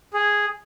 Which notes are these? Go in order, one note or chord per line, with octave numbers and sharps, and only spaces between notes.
G#4